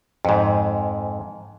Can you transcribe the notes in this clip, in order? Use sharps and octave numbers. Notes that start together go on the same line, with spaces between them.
F2 G#2